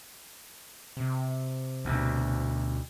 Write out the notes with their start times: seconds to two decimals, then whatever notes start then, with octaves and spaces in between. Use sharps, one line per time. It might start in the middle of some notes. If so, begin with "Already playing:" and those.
0.97 C3
1.85 D2 B2